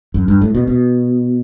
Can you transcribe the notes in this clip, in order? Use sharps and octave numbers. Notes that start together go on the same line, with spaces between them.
F#2
G2
A2
B2
B2